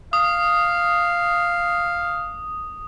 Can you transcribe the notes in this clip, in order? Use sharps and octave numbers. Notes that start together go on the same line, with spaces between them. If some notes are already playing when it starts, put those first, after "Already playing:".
F5 D#6